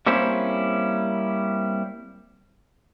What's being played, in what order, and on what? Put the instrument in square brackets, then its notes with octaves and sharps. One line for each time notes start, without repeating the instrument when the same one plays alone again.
[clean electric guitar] G3 A#3 C4 C#4 E4 C5